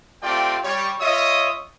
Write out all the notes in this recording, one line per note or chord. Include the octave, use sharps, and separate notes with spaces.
A3 C4 F4 G4 D5 G5
G3 G4 C#5
F4 C#5 D#5 E5 D#6